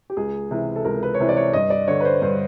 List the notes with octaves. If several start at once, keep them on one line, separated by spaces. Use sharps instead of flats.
G4
C#2 G#4
C3 E3
A4
C#2 A#4
B4
C#5
C3 E3 C5
D5
C#5
G2 D#5
D5
D3 C#5
B4
C5
G2 C5